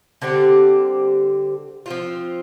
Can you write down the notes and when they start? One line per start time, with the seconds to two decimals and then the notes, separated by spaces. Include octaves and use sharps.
0.22 D3 G3 C4 G4
1.86 F3 C4 F4